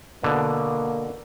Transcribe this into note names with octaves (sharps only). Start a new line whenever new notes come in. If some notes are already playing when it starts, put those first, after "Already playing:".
B2 D3 A#3